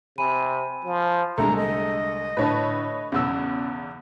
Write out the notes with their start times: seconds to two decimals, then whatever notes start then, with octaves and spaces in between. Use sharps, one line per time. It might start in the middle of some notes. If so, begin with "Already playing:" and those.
0.18 C3 G#5 B5 D#7
0.85 F3
1.38 C2 D3 G#3 A3 A#5
1.56 D#5
2.37 A2 D3 B4 C#5 A5
3.12 B1 E2 C#3 F#5 E6